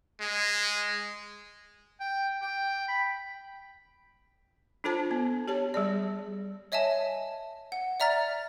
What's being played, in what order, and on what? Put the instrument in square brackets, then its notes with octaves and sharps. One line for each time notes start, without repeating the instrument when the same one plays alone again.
[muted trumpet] G#3
[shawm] G5
G5
B5
[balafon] D4 F4 A4 C5 A5
B3
G4 C#5 A5
G3 G#4 D5
[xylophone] C#5 D#5 E5 G#5 A5
F#5
D5 E5 A#5 F6 A6